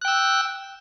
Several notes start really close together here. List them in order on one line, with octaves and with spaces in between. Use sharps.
F#6 G5 E6